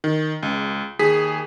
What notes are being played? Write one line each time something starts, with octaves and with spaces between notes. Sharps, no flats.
D#3
C#2
D#2 G#4 B6